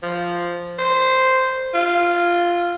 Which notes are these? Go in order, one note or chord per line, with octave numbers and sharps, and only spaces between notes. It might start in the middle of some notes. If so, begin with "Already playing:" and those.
F3
C5
F4